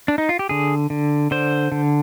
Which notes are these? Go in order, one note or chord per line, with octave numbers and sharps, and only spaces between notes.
D4
D#4
F4
G4
D3 G#4
D3
D3 C5
D3